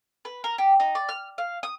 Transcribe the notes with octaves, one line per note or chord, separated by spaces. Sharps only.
B4
A#4
G4
D#4
D5
F6
F5
D#6